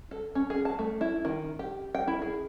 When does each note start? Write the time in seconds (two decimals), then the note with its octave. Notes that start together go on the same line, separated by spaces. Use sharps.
0.11 A4
0.35 C#4
0.50 G#4
0.65 A5
0.79 A3
1.01 E4
1.25 D#3
1.59 G4
1.95 G5
2.08 E4
2.22 G#4